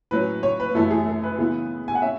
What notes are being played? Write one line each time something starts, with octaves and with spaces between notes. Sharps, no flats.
A2 F#3 C#4 B4
C#5
B4
F#2 E3 A3 A4
G#4
A4
B4
C#3 E3 B3
G#5
F#5
C#4 E5